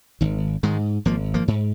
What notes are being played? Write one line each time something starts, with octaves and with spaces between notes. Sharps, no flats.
G#1 D#3
G#2 D#3 G#3
G#1 F3 A#3
F3 A#3
G#2